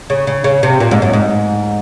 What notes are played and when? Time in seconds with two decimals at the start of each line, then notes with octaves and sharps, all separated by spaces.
0.10 C#3
0.27 C#3
0.44 C#3
0.63 C3
0.80 A#2
0.91 G#2
1.02 F#2
1.13 G#2